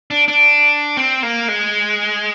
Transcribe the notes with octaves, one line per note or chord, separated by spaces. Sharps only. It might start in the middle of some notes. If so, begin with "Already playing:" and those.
D4
D4
C4
A#3
G#3